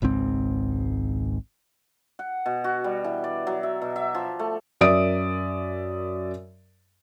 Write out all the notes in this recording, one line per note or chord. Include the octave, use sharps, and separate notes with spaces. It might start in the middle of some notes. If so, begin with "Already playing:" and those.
G#1 C#2 G#2 C4
F#5
B2
F#4
G3
E3
D5
F#3
E5
B2
E5
F3
A3
F#2 A#4 D5 E5 D#6 D7